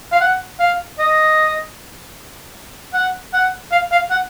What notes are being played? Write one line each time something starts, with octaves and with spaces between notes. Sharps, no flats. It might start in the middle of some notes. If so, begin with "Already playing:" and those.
F5
F#5
F5
D#5
F#5
F#5
F5
F5
F#5